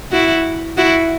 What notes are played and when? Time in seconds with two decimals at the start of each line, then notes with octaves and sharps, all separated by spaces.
0.12 E4 F#4
0.77 E4 F#4